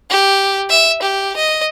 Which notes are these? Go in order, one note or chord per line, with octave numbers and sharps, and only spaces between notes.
G4
E5
G4
D#5